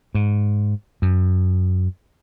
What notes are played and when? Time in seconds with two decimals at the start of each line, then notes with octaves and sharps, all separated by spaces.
0.15 G#2
1.02 F#2